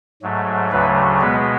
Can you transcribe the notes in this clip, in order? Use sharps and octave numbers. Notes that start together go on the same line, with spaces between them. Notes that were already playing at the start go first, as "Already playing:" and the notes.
G#2 F#3 A3
D2 C#3 F#3 A3 B4
B2 G#3 B3 B4